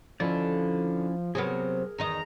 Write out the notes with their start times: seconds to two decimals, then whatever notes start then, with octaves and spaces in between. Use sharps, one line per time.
0.20 D#2 D3 F3 C#4 E4 D5
1.35 C3 F#3 B3 G#4 A#4
1.98 E2 D#3 D#5 A#5